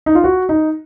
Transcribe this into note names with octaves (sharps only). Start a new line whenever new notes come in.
D#4
F4
F#4
D#4